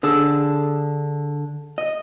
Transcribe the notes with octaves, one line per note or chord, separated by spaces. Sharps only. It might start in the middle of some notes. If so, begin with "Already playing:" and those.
D3 G#4 A4
D#5